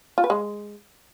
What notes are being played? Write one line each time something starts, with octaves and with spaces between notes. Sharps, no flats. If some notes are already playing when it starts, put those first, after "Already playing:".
F4
B4
G#3